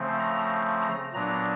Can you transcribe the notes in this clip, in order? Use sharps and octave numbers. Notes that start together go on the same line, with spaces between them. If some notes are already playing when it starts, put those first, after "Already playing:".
Already playing: C#3 F3 A3 C4
A#5
A#5
A#2 F#3 B3 D4 A#5